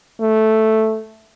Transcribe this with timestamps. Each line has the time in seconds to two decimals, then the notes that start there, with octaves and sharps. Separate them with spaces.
0.21 A3